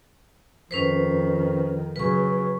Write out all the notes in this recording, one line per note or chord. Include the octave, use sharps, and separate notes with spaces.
F2 D#3 C#4 B4 C5
C#3 F#3 B4 C#6